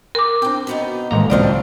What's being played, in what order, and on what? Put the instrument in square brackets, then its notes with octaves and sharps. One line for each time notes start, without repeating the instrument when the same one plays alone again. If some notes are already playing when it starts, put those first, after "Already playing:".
[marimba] A#4 D6
[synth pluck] C4 D4 [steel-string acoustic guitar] C5 G5
[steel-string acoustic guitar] B2 B3 D#4
[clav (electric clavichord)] A1 A#5 [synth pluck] D#3 G#3 A#3
[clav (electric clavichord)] C#2 F3 [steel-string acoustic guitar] A#2 C4 D4 [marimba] D5